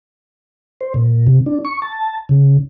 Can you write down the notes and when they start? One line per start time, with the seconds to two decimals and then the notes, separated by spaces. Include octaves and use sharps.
0.81 C5
0.94 A#2
1.27 C3
1.46 D4
1.65 C#6
1.82 A5
2.29 C#3